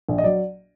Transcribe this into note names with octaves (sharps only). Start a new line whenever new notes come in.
A#1
D#5
F#3 D5